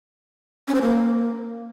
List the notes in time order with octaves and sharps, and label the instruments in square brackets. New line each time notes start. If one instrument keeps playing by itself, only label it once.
[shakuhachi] C#4
C5
A#3